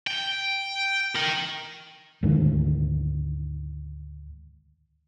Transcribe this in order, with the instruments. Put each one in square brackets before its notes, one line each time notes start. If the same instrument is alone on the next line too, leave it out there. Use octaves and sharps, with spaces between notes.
[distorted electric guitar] G5
A#4 G5
[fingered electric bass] D2 G#2 D#3